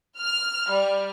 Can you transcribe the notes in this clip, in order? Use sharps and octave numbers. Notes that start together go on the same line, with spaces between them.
F6
G3